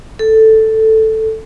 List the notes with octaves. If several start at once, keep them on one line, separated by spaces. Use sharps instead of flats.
A4